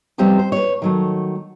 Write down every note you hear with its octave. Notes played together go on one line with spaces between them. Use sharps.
E2 F3 G3 C4 D#4
C5
B4 C#5
D#3 F#3 A3